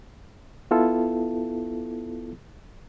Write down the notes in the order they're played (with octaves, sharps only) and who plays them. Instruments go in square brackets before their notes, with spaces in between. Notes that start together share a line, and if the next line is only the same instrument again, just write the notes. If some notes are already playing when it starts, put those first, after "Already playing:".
[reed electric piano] B3 E4 F4 A4